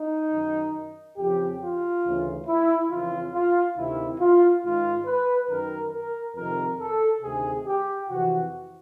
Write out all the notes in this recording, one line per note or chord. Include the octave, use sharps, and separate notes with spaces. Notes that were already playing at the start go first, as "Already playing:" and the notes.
Already playing: D#4
F#2 D#3
F2 C#3 F3 G4
F4
D2 C#3 E3
E4
F2 C#3 E3 F4
F4
D2 C3 D#3 E4
F4
G#2 D#3 F4
B4
F#2 D#3 A#4
A#4
F2 C3 D#3 A#4
A4
D2 C3 D#3 G#4
G4
F2 C3 E3 F#4